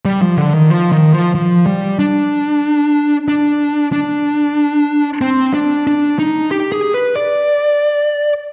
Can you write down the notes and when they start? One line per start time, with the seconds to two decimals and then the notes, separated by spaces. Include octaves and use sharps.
0.05 G3
0.21 F3
0.37 D3
0.54 D#3
0.70 F3
0.92 D#3
1.13 F3
1.35 F3
1.66 G3
1.99 D4
3.28 D4
3.92 D4
5.21 C4
5.54 D4
5.87 D4
6.19 D#4
6.51 G4
6.72 G#4
6.94 B4
7.16 D5